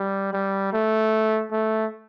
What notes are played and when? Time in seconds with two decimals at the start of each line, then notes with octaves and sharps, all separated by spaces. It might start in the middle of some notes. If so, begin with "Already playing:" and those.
Already playing: G3
0.33 G3
0.73 A3
1.52 A3